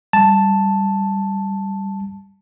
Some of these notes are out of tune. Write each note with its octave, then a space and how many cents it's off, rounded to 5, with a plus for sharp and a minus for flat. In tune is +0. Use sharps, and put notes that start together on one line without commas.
G3 +0 A5 +0